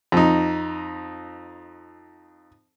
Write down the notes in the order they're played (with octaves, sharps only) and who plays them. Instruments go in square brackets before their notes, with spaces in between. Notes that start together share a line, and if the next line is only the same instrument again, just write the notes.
[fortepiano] F2 D#4